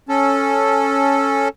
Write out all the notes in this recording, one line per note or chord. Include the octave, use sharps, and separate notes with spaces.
C#4 A4